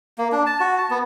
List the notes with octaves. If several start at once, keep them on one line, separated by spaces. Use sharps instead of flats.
A#3
D4
A5
F#4
A5
B3